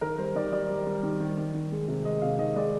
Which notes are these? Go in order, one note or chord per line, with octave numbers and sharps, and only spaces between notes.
D#3 A#4
G3 C5
D#3 D5
G3 D5
G3
G3
D#3
D#3
D#3
D#3
G#3
C3
G#3 D#5
C3 F5
D#3 D#5
G#3 D5